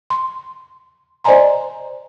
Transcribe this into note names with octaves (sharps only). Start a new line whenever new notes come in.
C6
C5 D5 D#5 G#5 A#5 C6